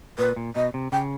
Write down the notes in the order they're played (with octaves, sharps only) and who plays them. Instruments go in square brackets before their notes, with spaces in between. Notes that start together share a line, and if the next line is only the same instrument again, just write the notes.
[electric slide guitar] A#2 [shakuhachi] B4
[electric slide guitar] A#2
[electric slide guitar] B2 [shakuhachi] D#5
[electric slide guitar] C3
[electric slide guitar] C#3 [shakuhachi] G5